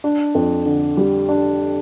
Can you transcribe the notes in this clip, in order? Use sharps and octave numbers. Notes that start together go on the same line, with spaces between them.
D4
F2
D3
G3
D4